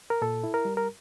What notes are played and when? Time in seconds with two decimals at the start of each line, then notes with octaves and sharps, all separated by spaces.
0.10 A#4
0.22 A#2 A4
0.44 E4
0.54 A#4
0.65 G3
0.77 A#4